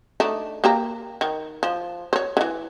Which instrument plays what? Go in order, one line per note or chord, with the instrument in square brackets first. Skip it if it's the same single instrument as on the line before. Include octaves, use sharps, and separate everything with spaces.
[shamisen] A3 D4 D#4
A#3 G4 A#5
D#3
F3
C5 C#5
D3 E3